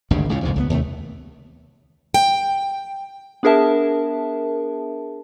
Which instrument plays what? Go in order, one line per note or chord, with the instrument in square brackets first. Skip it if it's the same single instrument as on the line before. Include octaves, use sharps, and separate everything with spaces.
[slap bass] G#1 D2 G2 C#3
C#2 A2 C#3
C2 F2 G#2 F3
C#2 F3 B3
D#2 C3 A3
[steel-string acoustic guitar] G5
[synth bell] B3 D4 G#4 A#4 E5 A5